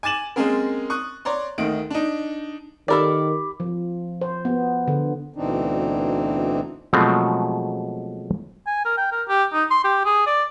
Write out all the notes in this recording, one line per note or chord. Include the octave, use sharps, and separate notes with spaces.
G#5 D6 A6 E7 F#7
G#3 A#3 C4 C#4 G#4 A#4
C#6 D#6 F#6
C#5 D5 A#5 C6
D2 D#3 D#4 D7
D4 D#4
D#3 G4 A4 A#4 D5 B5 D6
F3
C5
B3
D3
D2 B2 E3 C4 D4 D#4
B2 F3 F#3 G#3 A3 C4
G#5
A#4
G5
A#4
G4
D#4
C6
G4
G#4
D5